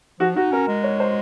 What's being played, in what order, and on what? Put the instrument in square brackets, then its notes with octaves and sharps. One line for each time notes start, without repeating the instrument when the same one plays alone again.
[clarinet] F3 [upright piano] F#4
[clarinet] D#4 [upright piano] F#4
[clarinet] C#4 [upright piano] A#4
[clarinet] G#3
[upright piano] C#5
C5